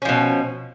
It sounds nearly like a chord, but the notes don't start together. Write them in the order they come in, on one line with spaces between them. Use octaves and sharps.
C#4 F3 B2